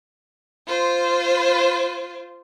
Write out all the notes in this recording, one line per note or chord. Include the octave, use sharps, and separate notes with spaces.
F4 C5